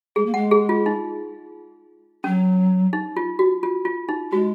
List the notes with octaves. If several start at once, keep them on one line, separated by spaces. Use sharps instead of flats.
G#3 G#4
A#3
G#3 F#5
G#4
F4
D#4
F#3 C#4
D#4
F4
F#4
F4
F4
D#4
G#3 F#4